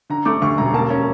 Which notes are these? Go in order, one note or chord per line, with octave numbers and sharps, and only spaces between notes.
D3 A#5
A3 D6
D2 C#6
E1 A#5
A#3 A5
C#4 A#5